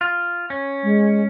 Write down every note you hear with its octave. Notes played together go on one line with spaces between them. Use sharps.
F4
C#4
G#3